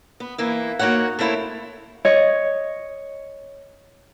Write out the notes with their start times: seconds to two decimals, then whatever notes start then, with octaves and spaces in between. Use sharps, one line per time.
0.20 B3
0.38 E3 A#3 E4
0.79 A#3 D#4 F#4 C#5 F#5
1.19 A3 A#3 C4 E4 C#5
2.05 C#5 D#5